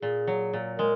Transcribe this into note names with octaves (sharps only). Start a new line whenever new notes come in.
A#2 G#4
F#3
A#2
G#3 A#4